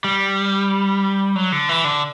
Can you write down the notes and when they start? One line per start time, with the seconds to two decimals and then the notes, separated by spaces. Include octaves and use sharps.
0.04 G3
1.36 F#3
1.52 D3
1.69 E3
1.84 D3